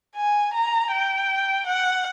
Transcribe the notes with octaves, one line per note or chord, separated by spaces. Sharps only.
G#5
A#5
G5
F#5